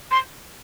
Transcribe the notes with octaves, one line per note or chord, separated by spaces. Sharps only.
C6